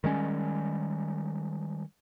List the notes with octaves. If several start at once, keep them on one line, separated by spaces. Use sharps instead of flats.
D#3 G3 G#3 C#4